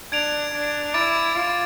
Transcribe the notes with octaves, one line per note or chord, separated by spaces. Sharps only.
D4 G#6 D7 F7
D4
E4 D6 A6 D7
F4